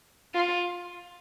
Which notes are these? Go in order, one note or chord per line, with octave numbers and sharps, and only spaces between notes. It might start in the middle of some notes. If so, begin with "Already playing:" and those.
F4